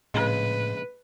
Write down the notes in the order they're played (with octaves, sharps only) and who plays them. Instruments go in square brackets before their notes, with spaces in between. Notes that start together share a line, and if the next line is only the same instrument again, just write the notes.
[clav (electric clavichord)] A#1 C#3 G#3 [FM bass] A2 [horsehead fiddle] B4